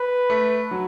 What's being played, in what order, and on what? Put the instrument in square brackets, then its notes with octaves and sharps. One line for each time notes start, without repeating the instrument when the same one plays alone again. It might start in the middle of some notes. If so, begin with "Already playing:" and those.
Already playing: [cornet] B4
[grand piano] A3
F#3